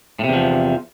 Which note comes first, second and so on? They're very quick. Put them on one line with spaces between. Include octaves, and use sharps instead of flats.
A2 C3 E2 F3